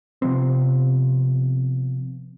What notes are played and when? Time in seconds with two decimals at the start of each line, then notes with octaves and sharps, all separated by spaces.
0.22 C3 F3 B3 C4